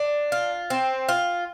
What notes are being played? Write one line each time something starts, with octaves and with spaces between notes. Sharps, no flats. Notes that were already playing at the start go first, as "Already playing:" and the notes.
Already playing: D4
F4
C4
F4